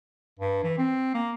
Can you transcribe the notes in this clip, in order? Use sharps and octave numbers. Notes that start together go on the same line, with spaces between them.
G2
E3
C4
A#3